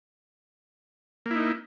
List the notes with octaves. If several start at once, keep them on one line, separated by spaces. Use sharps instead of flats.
A#3 D#4 E4